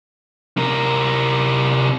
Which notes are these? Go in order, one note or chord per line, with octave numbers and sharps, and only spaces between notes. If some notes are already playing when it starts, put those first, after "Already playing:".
C3 A#4